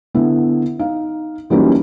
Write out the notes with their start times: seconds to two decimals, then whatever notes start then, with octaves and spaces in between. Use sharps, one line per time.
0.14 D3 B3 E4
0.79 D#4 F5
1.50 E3 F#3 G3 A#3 C#4 D#4